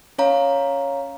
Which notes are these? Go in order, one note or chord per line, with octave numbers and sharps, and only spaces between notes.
C#4 C#5 F5 A#5